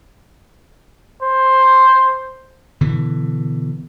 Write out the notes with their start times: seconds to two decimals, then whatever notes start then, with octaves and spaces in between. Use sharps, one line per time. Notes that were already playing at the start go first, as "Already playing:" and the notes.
1.23 C5
2.81 B2 D3 E3